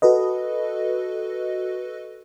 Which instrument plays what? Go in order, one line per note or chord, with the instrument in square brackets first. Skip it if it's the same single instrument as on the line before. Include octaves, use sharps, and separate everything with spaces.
[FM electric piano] F#4 A4 B4 D#5